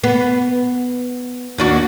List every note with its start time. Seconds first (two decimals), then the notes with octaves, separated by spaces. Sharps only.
0.04 B3
1.58 D#2 D4 F#4